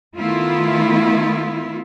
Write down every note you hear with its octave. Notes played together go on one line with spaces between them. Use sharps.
D#3 A3 B3 E4 F4